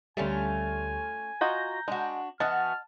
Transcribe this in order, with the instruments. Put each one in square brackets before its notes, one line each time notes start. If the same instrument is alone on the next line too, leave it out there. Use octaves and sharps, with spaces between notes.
[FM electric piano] D2 G3 [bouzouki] A3 C#4 F4 [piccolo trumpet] G#5
[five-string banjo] F4 F#4 D#5 [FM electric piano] A#5 G6 A#6
[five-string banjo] G#3 [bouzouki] D4 F#4
[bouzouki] E3 B3 F#4 [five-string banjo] D#5 F#5 [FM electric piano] A5 [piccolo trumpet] F6